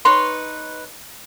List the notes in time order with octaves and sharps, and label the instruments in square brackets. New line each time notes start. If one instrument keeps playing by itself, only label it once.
[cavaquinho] D#4 B4 C#5 C6